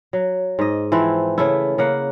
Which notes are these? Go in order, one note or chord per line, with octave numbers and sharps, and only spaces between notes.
F#3
G#2 D#5
E3 F3 C4 E4
C#3 A3 E4
C#3 A#3 F#5